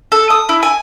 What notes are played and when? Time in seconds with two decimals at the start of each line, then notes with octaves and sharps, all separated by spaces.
0.12 A4
0.30 D#6
0.49 E4
0.63 G#5